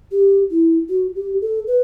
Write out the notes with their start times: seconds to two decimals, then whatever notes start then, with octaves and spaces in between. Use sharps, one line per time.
0.12 G4
0.51 E4
0.89 F#4
1.16 G4
1.41 A4
1.67 B4